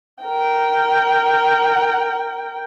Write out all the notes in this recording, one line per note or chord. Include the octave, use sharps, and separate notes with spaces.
A#4 G5